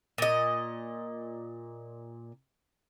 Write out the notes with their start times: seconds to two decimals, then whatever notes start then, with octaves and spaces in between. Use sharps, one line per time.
0.18 A#2 D#5